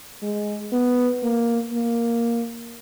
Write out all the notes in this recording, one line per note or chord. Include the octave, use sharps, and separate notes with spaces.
G#3
B3
A#3
A#3